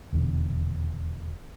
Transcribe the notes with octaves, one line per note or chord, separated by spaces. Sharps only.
D#1 E2 B2 D3